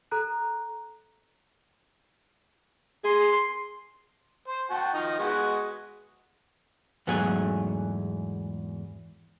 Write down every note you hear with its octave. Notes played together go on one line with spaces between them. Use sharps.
A4 A#5 F#6
G#4 C6
C5
F#4 G5 A5
D#3 F3 D#4
G#3 B3 F#4
E2 G#2 F#3 A3 G#4